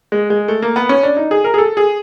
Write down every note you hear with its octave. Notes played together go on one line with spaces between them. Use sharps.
G#3
G#3
A3
A#3
B3
C#4
D4
D#4
G#4
A#4
G#4
A4
G#4